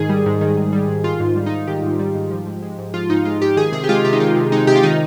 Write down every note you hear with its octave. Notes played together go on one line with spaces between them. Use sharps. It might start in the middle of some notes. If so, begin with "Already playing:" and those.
Already playing: G#2 D#3 G#4
G3
G#2
D#3
G#2
G3
G#2
D#3 F4
G#2
G3
D#4
G#2
D#3 G4
G#2
G3
G#2
F3
G#2
G#3
G#2
F3 F4
G#2 D#4
G#3 F4
G#2 G4
D#3 G#4
C3 G#4
G4
G#3 F4
C3 G4
D#4
D#3 F4
C3
G#3 D#4
C3 G4
F4
D#3 D#4